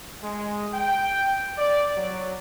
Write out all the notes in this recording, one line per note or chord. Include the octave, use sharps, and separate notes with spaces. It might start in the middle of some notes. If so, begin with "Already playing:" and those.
G#3
G5
D5
F#3